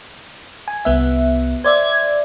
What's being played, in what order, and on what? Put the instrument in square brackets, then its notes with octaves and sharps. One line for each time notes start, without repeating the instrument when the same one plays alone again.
[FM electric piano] G#5
C2 B3 E5
[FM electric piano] C5 D5 E5 [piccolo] G#6